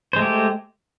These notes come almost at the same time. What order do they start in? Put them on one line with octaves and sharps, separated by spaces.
C5 G#3 A3 G4